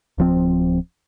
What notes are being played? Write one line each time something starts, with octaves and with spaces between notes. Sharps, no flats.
D1 F3 C4